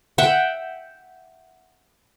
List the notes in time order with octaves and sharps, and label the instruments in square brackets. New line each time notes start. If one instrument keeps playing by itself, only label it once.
[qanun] E5 F#5 G5